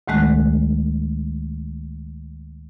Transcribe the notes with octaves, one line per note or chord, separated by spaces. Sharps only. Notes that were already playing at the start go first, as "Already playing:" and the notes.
D2 A2 D#3 G#3 A3 F#6